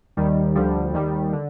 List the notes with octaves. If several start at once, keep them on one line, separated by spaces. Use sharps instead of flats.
D#2 D#3 G3
D2 D3 F3 G3
D#2 D#3 G3
D3